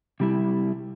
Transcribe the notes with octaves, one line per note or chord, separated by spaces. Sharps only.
C3 G3 E4